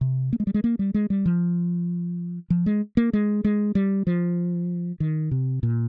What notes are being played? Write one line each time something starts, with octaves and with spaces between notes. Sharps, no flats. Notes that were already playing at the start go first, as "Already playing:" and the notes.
C3
A#3
G#3
G3
G#3
A#3
G3
G#3
G3
F3
F3
G#3
A#3
G#3
G#3
G3
F3
D#3
C3
A#2